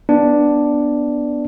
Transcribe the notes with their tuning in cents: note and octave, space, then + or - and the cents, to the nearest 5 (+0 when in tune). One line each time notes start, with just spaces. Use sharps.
B3 +0 D4 +0